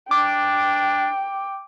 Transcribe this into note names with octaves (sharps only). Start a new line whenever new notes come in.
D4 G5 D6